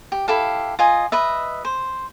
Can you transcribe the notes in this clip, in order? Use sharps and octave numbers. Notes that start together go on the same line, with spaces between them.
G4
E4 G4 A4 F5
F4 D#5 G#5
B4 D#5 E5
C5